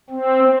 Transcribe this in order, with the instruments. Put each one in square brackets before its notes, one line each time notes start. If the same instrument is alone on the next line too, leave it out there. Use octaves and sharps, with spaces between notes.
[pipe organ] C4